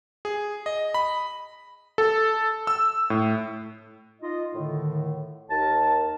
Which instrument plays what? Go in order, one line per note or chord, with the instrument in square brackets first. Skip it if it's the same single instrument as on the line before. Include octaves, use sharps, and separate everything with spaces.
[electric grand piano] G#4
D#5
B5
A4
E6
A2
[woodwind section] D#4 F4 D#5
A2 D3 D#3
D#2 A#4 A5